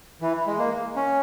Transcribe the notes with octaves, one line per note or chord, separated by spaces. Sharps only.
E3
G#3
A#3
C#4